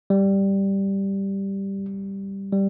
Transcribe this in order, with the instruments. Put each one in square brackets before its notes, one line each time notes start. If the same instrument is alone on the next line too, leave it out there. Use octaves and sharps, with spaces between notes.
[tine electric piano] G3
G3